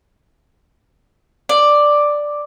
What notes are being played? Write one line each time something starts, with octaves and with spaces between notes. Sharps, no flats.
D5